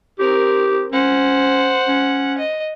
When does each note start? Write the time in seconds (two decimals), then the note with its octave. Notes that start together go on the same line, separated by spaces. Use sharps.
0.19 C4 G4 A#4
0.92 C#4 C5 F#5
1.88 C#4
2.38 D#5